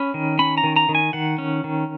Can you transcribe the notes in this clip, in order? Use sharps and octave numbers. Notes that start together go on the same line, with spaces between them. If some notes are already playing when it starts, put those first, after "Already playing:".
Already playing: C#4 B5
D#3
C#4 B5
A#5
D#3
A#5
D#3
G#5
D#3 F#5
C#4
D#3